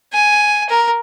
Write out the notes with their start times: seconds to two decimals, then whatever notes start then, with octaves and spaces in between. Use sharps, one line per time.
0.13 G#5
0.69 A#4